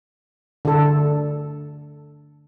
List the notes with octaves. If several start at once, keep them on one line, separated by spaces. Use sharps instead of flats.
D3 A4